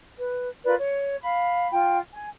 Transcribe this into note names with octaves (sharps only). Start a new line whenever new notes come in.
B4
F4 A#4 B4 D5
C#5
F5 B5
F4 G5
G#5